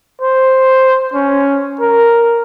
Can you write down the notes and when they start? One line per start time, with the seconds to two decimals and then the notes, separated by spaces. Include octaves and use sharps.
0.21 C5
1.14 C#4
1.81 A#4